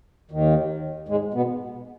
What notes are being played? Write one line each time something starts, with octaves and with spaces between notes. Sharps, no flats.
D#2 D#3
G#2 G#3
B2 B3